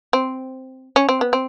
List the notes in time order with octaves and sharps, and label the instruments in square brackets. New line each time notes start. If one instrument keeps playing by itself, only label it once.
[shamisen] C4
C#4
C4
B3
C4